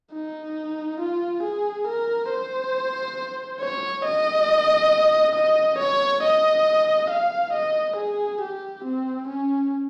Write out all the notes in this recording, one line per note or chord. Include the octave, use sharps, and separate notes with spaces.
D#4
F4
G#4
A#4
C5
C#5
D#5
D#5
C#5
D#5
F5
D#5
G#4
G4
C4
C#4